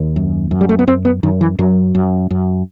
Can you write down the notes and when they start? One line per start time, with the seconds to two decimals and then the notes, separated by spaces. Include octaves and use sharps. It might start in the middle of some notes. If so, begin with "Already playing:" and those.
Already playing: D#2
0.16 F#2
0.51 F#2
0.61 G3
0.69 A3
0.79 B3
0.87 F#2 C4
1.05 B3
1.23 F#2 D#3
1.41 E3
1.59 F#2 F#3
1.95 F#2
2.31 F#2